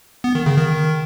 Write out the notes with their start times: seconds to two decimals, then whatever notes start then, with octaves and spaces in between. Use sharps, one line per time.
0.24 B3
0.35 D#3
0.46 C#3
0.57 D#3